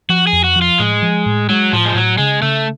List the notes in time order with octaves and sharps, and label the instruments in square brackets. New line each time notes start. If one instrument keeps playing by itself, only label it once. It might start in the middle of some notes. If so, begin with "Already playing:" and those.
[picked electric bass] F3 [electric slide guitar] F#4
[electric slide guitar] G#4
[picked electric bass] F2
[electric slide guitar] F#4
[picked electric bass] F3
[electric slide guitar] F4
[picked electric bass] A2 [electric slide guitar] G#3
[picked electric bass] F3
A2
[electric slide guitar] F#3 [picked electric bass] G#3
[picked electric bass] A2 [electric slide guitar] F3
[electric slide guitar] G#3
[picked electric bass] A2 [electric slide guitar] F#3
[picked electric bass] C#3 [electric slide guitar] G#3
[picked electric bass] C#3 [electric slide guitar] A3